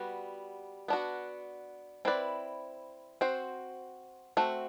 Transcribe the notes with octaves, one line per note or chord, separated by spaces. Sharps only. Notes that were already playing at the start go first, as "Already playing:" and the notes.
Already playing: G3 B3 F#4
B3 D4 F#4
C4 E4 B4 D5
C4 F#4 C5
A3 C4 F#4